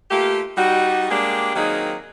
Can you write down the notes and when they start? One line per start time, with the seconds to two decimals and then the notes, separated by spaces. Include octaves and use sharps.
0.11 A3 A#3 F4 G4
0.57 G3 D#4 F#4
1.10 G#3 A#3 D4 G4
1.55 D#3 F#3 A#3 C4 D#4 G#4